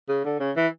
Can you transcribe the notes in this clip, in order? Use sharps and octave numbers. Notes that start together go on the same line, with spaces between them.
C#3
D3
C#3
E3